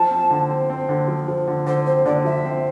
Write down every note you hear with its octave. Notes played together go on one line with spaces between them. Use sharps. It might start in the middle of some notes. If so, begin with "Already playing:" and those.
Already playing: F3 A5
C4
D3
C4
C4
D3
F3
F3
D3
D3 C5
C4 C5
D3 D5
F3 E5
C4